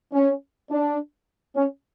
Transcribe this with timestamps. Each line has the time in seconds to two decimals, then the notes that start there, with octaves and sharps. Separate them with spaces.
0.13 C#4
0.70 D4
1.56 C#4